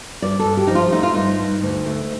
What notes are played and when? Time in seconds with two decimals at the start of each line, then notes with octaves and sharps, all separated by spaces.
0.22 G2 D5
0.39 A4
0.46 G2
0.57 G4
0.67 F3 D#4
0.75 F4
0.92 A3 D#4
1.03 F4
1.14 G2 D#4
1.39 G2
1.63 D2
1.86 A3